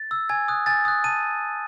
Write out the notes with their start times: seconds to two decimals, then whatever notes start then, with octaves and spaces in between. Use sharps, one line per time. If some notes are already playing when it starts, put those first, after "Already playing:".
Already playing: A6
0.11 E6
0.29 G#5 G#6
0.48 D#6 F#6
0.66 G#5 A6
0.85 D#6 F#6
1.04 A5 D#7